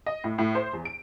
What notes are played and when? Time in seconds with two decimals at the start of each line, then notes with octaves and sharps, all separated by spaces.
0.06 D#5
0.24 A2
0.38 A2
0.55 C5
0.73 E2
0.85 D7